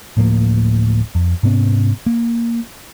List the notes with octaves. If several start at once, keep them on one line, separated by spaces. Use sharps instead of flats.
D1 A2 F3 A#3
F2
G#2 C3 B3 C#4
A#3